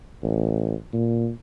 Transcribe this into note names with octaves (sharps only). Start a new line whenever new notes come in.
A1
A#2